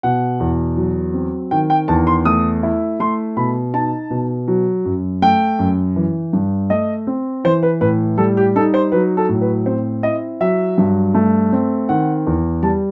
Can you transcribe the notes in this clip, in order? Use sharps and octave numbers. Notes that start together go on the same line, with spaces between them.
B2 F#5
E2
F#3
C4
D#3 G5
G5
E2 A5
C6
A3 D#6
E4
A3 C6
B2 B5
D#4 A5
B2
F#3
F#2
A3 G5
F#2
E3
G2
A3 D#5
C4
E3 C5
B4
A2 B4
G3 A4
G4
D#4 A4
C5
F#3 B4
A4
A2
B4
C4 C5
E4 D#5
F#3 E5
G2
A3
C4
D#3 F#5
E2
G3 A5